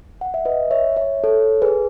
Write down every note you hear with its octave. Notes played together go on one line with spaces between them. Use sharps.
F#5
E5
B4 D#5
C#5 E5
C#5 E5
A4 C#5
G#4 B4